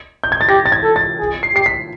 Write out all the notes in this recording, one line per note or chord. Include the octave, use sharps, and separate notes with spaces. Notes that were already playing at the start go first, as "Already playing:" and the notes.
G6
G#6
A6
G4 A#6
A6
G#6
A4
A6
G#4
C7
G4 C7
B6